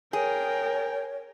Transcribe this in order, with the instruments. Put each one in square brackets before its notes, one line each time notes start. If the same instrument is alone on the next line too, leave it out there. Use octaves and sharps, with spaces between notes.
[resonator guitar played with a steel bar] G#4 [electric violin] A#4 G5 [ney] C#5